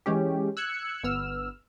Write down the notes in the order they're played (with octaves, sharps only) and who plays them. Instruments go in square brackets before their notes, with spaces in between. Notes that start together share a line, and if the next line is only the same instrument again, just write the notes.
[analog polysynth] E3 G#3 C#4 G4
E6 F#6 G#6 C#7
G1 B3 E6 F6